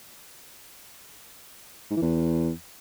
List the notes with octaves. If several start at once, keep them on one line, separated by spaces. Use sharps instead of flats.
G#2
E3
E2